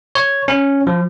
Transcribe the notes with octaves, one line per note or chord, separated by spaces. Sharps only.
C#5
C#4
F3